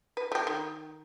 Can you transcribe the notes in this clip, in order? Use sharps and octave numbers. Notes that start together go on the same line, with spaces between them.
B4
A3 G4
D#3